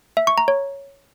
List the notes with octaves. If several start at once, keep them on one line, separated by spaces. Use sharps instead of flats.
E5
C#6
A#5
C#5